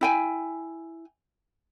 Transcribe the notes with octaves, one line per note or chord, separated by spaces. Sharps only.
E4 G5 G#5